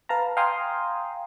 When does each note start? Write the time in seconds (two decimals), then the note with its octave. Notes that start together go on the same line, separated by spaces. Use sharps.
0.09 B4 F5 A5 A#5
0.37 F5 G5 G#5 A#5 C6 D#6